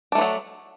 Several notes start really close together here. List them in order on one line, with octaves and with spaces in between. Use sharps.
D4 A3 E3 F#3